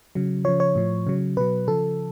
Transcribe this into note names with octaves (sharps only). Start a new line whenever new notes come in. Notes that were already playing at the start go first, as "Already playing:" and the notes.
C#3 F#3
C#3 F3 C#5
C#5
A2 F3
C#3 F#3
B2 F#3 B4
C#3 F3 A4